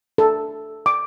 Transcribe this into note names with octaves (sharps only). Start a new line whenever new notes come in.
A4
D6